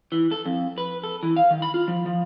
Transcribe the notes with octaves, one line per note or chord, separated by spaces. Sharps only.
E3
A4
F2
B4
A4
E3
F5
D#3
B5
F4
F3
F3